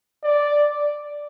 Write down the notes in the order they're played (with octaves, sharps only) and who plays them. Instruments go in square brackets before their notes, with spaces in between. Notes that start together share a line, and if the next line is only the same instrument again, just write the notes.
[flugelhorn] D5